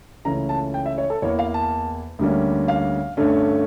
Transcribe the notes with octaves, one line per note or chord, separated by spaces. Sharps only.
C#2 C#3 E3 A3 C#4 A#5
A5
G5
E5
C#5
A4
E2 E3 A#3 C#5
F5
A5
D2 D3 G3 A#3 C#4
F5
G2 D3 A3 C#4